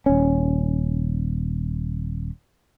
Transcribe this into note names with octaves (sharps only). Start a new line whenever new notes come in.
D#1 C#4